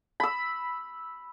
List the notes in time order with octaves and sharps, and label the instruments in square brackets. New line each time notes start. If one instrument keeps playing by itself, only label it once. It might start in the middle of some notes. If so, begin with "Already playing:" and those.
[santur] B5 E6